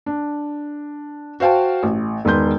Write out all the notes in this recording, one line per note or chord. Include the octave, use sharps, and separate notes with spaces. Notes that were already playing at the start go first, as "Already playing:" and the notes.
D4
F#4 C5 F5 G5 A5
A1
E1 D#3 B4 C6 G6